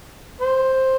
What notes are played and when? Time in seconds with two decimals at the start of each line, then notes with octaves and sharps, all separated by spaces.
0.41 C5